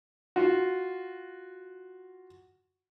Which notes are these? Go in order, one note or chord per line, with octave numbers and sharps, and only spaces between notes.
F4 F#4